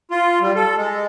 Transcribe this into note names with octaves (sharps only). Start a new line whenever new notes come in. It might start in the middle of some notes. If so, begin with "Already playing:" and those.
F4
G3
A4
G#3